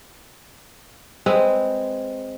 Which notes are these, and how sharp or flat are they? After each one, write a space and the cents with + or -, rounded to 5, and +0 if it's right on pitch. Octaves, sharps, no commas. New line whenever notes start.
G#3 +0 C4 +0 B4 +0